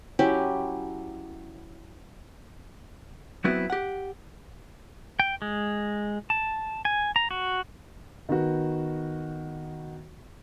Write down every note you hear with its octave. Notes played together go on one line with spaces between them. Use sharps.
F#3 C#4 E4 G4
F#3 B3 C4 E4 F#4 B4
G4 F#5
G5
G#3
A5
G#5
A#5
F#4
D#3 B3 F#4